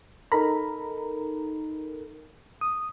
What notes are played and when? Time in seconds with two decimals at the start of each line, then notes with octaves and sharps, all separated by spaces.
0.32 D#4 A4 A#4 A#5 B5
2.61 D#6